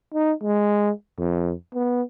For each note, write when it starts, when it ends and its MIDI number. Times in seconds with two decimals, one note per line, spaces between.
0.14 0.33 63
0.43 0.91 56
1.19 1.54 41
1.74 2.03 59